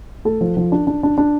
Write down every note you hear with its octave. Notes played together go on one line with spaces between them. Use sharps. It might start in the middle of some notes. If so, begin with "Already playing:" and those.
A3 A4
F3
F3
D4
D4
D4
D4